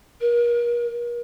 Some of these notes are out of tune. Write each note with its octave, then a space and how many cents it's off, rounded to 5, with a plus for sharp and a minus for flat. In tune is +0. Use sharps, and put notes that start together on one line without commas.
A#4 +35